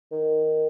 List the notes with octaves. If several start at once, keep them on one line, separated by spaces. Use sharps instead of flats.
D#3